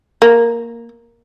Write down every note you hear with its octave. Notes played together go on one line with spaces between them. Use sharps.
A#3